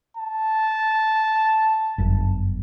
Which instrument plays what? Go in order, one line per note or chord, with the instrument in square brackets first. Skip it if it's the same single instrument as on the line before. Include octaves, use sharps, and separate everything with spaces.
[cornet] A5
[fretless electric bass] G1 F#2